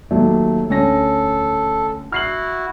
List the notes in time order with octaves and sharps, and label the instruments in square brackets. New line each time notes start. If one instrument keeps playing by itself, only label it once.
[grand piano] D#2 F#3 A3
[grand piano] D2 C#4 A#6 [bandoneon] A4
[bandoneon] E4 F#4 [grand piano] F6 C7 F#7